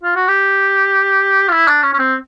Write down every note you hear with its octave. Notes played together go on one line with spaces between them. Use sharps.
F4
F#4
G4
F4
E4
D4
C#4
C#4
C4